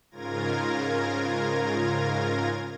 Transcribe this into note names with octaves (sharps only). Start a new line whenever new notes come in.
G#2 C#3 F4 A#4 G#6 A#6